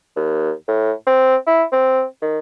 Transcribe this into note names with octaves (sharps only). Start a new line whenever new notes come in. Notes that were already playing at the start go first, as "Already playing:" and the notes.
D#2
A2
C4
E4
C4
D#3